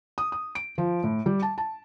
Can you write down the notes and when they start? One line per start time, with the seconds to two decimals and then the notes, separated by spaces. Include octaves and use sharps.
0.18 D#6
0.32 D#6
0.55 D7
0.78 F3
1.04 A2
1.26 G3
1.42 A5
1.58 A5